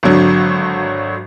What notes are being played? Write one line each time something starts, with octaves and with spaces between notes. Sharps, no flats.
G#1 D3 F#3